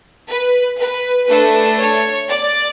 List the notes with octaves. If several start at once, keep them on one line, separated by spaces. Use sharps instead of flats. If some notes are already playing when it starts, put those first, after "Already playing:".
B4
B4
A3 D4 A4 B4
C#5
D5